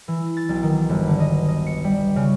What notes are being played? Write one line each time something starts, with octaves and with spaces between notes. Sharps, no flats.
E3
A6
B1
D#3
G1
D3
D#5
D#5
C#7
G3
C#3